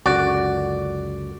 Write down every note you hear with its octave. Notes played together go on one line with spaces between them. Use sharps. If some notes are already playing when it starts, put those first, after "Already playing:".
C#2 F#2 D3 F#4 D5